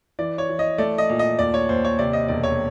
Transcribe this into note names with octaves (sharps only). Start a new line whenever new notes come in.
E3 D5
C#5
E3
D#5
A3 D5
D#5
A#2
D#5
D#2 D5
C#5
D#2 C5
C#5
C3 D5
D#5
E1 D5
C#5